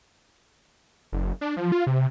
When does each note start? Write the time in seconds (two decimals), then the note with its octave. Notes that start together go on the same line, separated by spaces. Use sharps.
1.12 F#1
1.41 D4
1.57 F3
1.72 F4
1.87 C3